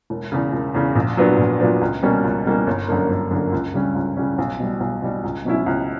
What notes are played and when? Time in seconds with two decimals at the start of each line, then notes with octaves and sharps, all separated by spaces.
0.10 E1
0.32 E2 C#3
0.53 E1
0.74 E2 C#3
0.96 A#1
1.17 A#2 F#3 B3 D4
1.38 A#1
1.59 A#2 F#3 B3 D4
1.81 C#2
2.03 B2 G3 A#3 C#4
2.24 C#2
2.45 B2 G3 A#3 C#4
2.67 G1
2.88 F#2 D3 A#3
3.10 G1
3.31 F#2 D3 A#3
3.52 C#2
3.74 C#3 G3 C#4
3.95 C#2
4.17 C#3 G3 C#4
4.38 B1
4.60 B2 G3
4.80 B1
5.02 B2 G3
5.24 C#2
5.45 B2 F#3 C#4 E4
5.66 C#2